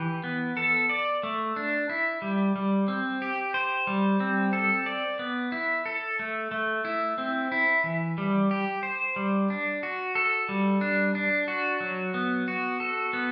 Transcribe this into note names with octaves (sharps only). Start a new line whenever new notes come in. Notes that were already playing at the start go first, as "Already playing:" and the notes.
Already playing: E3 G4
B3
A4
D5
A3
D4
E4
G3
G3
C4
G4
C5
G3
C4
A4
D5
B3
E4
A4
A3
A3
E4
C4
E4
E3
G3
G4
C5
G3
D4
F#4
A4
G3
D4
D4
F#4
F#3
B3
F#4
A4
B3